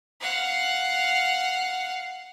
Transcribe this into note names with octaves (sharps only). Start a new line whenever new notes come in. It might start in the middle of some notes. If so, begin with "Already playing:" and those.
F5 F#5